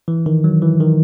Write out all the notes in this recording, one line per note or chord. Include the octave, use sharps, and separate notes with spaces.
E3
D#3
F#3
E3
D#3